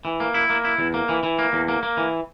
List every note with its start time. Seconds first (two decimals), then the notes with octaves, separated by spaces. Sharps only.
0.05 E3
0.20 A#3
0.34 E4
0.50 A#3
0.65 E4
0.79 E2
0.94 A#3
1.09 E3
1.23 E3
1.39 A#3
1.53 E2
1.68 A#3
1.83 A#3
1.97 E3